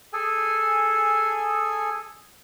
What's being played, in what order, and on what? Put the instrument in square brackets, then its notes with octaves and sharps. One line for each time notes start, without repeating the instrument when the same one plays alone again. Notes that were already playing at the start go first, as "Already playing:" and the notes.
[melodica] G#4 A4 G#5